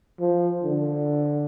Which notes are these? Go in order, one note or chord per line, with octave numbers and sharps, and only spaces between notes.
F3
D3